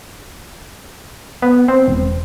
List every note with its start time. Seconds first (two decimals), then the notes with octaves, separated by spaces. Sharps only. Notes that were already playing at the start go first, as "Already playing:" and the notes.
1.42 B3
1.68 C4
1.88 E1